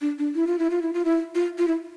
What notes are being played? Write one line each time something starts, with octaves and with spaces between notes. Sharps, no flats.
D4
D4
E4
F4
E4
F4
E4
F4
E4
F4
F4
E4